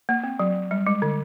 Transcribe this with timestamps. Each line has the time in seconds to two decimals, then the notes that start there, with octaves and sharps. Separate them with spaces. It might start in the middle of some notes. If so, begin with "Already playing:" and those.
0.09 A#3
0.24 C4
0.39 F#3
0.71 G3
0.87 G#3
1.02 D3